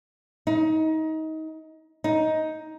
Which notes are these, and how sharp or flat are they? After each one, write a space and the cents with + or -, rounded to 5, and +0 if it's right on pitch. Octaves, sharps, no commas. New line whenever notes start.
D#4 +25
D#4 +10